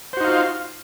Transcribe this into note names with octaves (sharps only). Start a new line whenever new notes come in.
D#4 F4 F#4 C5 F5